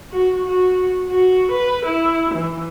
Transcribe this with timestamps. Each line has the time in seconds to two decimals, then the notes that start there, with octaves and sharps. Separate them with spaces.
0.11 F#4
0.45 F#4
1.09 F#4
1.52 B4
1.85 E4
2.35 E3